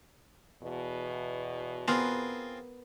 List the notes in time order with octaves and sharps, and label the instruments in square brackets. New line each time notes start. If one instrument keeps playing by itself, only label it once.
[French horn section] E2 B2
[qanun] B3 A#4 [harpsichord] C4 F4 G#4